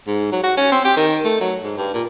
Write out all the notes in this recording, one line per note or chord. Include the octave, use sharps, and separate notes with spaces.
G#2
F#3
F#4
C#4
C4
G4
D#3
A3
F#3
G#2
G2
A#2